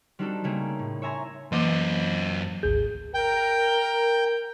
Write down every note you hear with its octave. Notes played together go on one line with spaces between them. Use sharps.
G3 C4 D4 D#4 F#4 A4
C#3 G3 A3 A#3 G#4
A2
C#5 E5 G#5 A#5 C6
F#2 E3 A#3 D#5 D6
G#1 D2 G#4 G6
A#4 G5